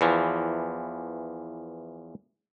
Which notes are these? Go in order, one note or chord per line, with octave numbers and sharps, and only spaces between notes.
E2 E3 F3